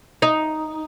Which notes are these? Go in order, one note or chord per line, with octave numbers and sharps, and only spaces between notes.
D#4